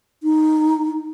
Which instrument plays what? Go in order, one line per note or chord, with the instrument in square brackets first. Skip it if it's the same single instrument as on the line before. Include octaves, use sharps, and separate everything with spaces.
[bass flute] D#4